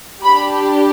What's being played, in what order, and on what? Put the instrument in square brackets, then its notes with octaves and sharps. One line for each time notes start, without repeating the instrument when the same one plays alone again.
[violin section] D4 G4 B5